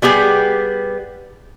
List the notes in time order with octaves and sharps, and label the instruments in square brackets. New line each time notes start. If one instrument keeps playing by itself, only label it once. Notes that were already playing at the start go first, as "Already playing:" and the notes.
[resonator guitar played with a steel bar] G3 B3 G4 G#4